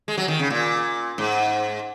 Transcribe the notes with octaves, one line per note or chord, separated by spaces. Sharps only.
G#3
F#3
D#3
C#3
A#2
G#2